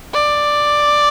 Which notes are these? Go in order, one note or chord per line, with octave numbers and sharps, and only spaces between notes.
D5